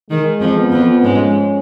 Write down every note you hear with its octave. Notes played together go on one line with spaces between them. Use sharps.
D#3 G#3
F2 F3
B3
F2 F3
G#2 G#3 C#4